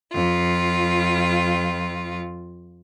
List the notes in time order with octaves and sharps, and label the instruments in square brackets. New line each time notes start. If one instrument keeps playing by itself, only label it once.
[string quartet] F2 F4